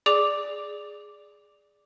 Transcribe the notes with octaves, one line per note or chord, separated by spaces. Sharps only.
G#4 D5 D6 F7